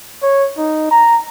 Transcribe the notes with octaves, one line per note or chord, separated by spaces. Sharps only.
C#5
D#4
A#5